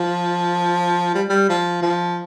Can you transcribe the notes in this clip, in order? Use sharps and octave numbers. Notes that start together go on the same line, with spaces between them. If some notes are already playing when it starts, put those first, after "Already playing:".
Already playing: F3
G3
G3
F3
F3